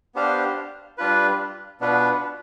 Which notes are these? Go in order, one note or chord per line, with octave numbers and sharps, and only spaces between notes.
B3 D4 G4 C5 F5
G3 D4 F4 B4
B2 B3 D4 F4 B4